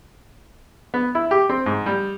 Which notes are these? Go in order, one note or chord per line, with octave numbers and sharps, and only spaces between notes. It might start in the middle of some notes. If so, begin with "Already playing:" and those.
B3
E4
G4
C4
G#2
G3